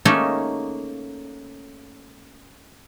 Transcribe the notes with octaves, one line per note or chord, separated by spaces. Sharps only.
A3 A#3 C#4 D#4 G#4 A4